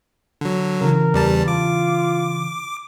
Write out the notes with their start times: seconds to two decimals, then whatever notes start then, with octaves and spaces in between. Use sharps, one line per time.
0.41 D3 F#3
0.81 C#3 E3 A#4
1.14 E2 G3 A5
1.48 F4 D6